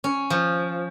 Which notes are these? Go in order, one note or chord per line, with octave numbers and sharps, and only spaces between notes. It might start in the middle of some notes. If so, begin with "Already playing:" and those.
C#4
F3